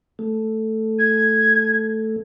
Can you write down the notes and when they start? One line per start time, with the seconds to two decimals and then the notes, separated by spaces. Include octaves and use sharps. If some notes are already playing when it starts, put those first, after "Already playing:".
0.19 A3
0.99 G#6